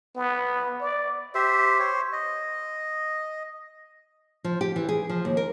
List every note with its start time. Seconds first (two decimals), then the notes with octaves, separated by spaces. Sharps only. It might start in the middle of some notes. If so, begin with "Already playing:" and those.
0.16 B3
0.81 D5
1.35 G4 C5 E5
1.80 C5 C#5
2.12 D#5
4.44 F3
4.61 G4
4.76 E3
4.89 G#4
5.09 F3
5.25 D#2
5.37 A#4